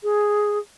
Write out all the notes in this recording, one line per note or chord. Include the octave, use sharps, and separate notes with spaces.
G#4